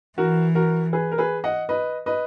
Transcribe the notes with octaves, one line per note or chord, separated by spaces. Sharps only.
E3 F#4 A#4
F#4 A#4
G#4 B4
A#4
G#4 B4
D#5 F#5
B4 D#5
B4 D#5